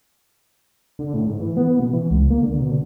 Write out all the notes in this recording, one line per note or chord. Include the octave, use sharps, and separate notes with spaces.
D3
A2
G#2
E3
B3
B2
E3
C#2
A#3
D3
B2
D3